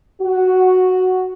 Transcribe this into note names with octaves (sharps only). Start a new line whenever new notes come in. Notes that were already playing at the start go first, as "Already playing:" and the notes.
F#4